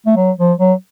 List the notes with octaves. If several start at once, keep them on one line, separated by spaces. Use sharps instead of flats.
A3
F#3
F3
F#3